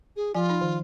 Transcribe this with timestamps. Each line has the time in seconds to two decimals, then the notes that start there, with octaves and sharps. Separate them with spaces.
0.16 G#4
0.35 F3 F4 G#5
0.50 D#4
0.61 D#3